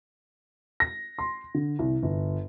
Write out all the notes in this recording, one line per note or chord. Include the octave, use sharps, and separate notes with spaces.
A#6
C6
D3
C2
G1